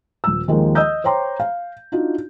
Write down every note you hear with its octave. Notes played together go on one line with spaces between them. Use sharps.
D#1 E6
D#2 D#3 F3 G#3 A#3
D#5 D#6 E6 G6
C5 C#5 G5 A#5 C6 D6
F5
D4 D#4 F4 F#4